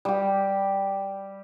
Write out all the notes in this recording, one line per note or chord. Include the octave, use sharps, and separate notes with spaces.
G3 G4